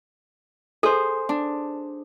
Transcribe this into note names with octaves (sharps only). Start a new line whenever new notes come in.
G#4 A4 C5
D4